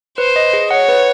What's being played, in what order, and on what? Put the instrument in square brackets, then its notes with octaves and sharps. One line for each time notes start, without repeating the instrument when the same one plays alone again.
[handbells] B4 [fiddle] C5
[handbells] D#5
G#4
[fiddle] C#5 [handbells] F#5
[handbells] B4